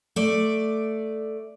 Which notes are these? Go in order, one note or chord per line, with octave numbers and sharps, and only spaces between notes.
A3 D5